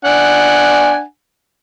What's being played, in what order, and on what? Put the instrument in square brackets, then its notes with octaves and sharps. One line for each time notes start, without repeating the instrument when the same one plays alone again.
[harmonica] D4 F#5 G#5